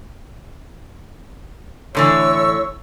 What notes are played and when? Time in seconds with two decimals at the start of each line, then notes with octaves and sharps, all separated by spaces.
1.95 A2 D3 E3 C#5 C#6 E6